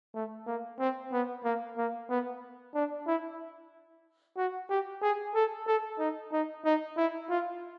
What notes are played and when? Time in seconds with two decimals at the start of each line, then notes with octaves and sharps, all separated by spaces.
0.14 A3
0.46 A#3
0.79 C4
1.12 B3
1.44 A#3
1.77 A#3
2.09 B3
2.75 D4
3.07 E4
4.37 F#4
4.69 G4
5.02 G#4
5.35 A4
5.67 A4
5.99 D#4
6.32 D#4
6.65 D#4
6.97 E4
7.30 F4